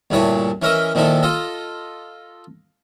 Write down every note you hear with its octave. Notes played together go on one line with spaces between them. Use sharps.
D2 G2 A#2 E4 C#5 A5
E3 C#4 A#4 D#5 E5
A#2 D#3 F3 D#4 E4 A4
F4 A4 D#5